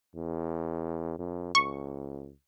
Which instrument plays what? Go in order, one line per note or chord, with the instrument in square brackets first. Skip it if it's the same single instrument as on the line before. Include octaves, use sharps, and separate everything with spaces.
[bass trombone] E2
F2
[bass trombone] C#2 [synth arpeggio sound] C#6